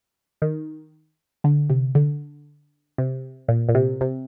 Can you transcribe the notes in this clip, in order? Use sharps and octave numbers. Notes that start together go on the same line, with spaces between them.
D#3
D3
C3
D3
C3
A#2
A#2
C3
C3